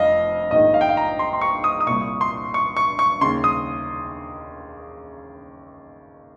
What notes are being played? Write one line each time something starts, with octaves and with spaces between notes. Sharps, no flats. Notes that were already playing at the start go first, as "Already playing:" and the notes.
Already playing: F1 F2 D#5 F5
A#1 G#2 D#3 D#5
F5
G5
F5
A#5
C6
C6
C#6
D#6
D#6
C2 A#2 C#6
C6
C#6
C#6
C#6
D#2 C#3 C6
D#6